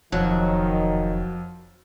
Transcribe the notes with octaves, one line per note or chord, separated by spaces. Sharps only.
E1 F2 D#3 F3 F#3